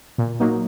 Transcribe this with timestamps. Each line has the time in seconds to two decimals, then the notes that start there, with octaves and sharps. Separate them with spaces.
0.18 A#2
0.40 F#3 A#3 D#4